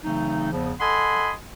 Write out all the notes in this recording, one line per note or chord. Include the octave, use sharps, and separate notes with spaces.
C#3 E3 F#3 A3 C4 D#4
E2 C#3 F3
A4 D#5 F#5 G#5 B5 C6